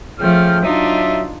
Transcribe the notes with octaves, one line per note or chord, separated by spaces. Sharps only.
C#3 F3 A3 G5 F6
F#3 D4 D#4 F4 E5